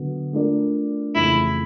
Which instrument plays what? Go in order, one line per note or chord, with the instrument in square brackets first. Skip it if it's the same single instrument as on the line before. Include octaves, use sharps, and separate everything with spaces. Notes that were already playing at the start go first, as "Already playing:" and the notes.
Already playing: [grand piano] D3 F#3 B3
A3 D4 F4 A#4 D5
[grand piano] F2 C#3 E3 A3 [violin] E4